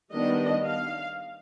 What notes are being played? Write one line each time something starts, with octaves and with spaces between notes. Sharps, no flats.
D#3 G3 B3 D4 D#5
F5